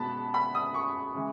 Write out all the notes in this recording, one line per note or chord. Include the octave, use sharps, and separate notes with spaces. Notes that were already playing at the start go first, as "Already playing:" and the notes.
Already playing: B2 G#3 B3 A5 B5
B5
D#6
C#6
C#3 E3 G#3